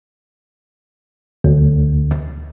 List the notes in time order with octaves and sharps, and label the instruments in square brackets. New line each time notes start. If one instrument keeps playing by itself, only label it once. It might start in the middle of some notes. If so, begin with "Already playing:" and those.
[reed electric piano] D2